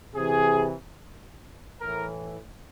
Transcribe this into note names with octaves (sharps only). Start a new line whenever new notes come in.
C3 E3 G#4
A2 E3 A#4